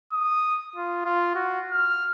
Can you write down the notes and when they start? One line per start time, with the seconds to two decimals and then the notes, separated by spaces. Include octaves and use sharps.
0.13 D#6
0.76 F4
1.05 F4
1.35 F#4
1.71 F6